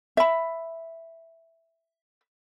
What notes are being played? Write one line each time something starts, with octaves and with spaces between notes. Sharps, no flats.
E5 B5